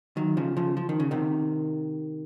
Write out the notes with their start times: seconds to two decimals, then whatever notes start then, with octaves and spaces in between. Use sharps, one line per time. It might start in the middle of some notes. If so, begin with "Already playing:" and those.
0.17 D#3 F#3
0.37 C#3 F3
0.57 C#3 F3
0.77 F3
0.89 D#3
1.00 C#3
1.11 C3 D#3